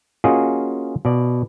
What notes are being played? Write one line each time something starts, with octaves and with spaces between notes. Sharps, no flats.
A#3 C#4 F4 F#4 G#4 D#5
B2 D5